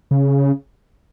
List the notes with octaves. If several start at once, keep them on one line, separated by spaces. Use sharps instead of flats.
C#3